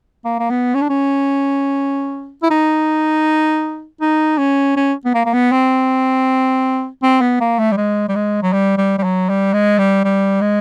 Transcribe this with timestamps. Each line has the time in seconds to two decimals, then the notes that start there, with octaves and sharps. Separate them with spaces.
0.25 A#3
0.39 A#3
0.50 B3
0.75 C#4
0.82 D4
0.89 C#4
2.43 E4
2.50 D#4
4.01 D#4
4.38 C#4
4.76 C#4
5.05 B3
5.14 A#3
5.25 A#3
5.33 B3
5.52 C4
7.03 C4
7.21 B3
7.40 A#3
7.59 A3
7.72 G3
7.77 G#3
8.09 G3
8.15 G#3
8.42 F#3
8.53 G3
8.78 G3
8.98 G3
9.03 F#3
9.29 G3
9.53 G#3
9.78 G3
10.04 G3
10.41 G#3